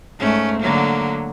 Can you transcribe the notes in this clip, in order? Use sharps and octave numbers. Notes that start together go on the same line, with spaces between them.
G#2 A3 C#4
D3 F#3 A#3